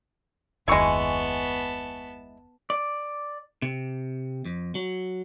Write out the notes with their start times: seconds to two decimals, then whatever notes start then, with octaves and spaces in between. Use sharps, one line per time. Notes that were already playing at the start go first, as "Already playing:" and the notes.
0.68 F#1 D#2 G#3 B3 E4 G#5 A5 C#6
2.70 D5
3.62 C3
4.45 F2
4.75 F#3